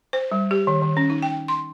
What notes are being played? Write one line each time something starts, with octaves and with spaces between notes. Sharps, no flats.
C5
G3
G4
D#3
D#3
C#4
D#4
G5
C6